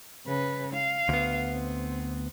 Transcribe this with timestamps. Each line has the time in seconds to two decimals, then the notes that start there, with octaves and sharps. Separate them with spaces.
0.27 C#3 B4
0.73 F5
1.09 D2 B3
1.52 C4